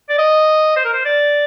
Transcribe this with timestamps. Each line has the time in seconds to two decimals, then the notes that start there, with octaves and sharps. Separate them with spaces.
0.09 D5
0.18 D#5
0.77 C5
0.85 A#4
0.93 C5
1.05 D5